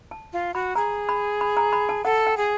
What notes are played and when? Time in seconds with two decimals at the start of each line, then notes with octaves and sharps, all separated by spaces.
0.11 A5
0.33 F4
0.54 F#4 B5
0.75 G#4 A#5
1.09 B5
1.41 B5
1.57 A#5
1.73 B5
1.89 A5
2.05 A4 F#5
2.27 G5
2.37 G#4